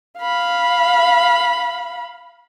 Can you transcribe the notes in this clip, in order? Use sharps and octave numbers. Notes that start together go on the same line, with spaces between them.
F5 B5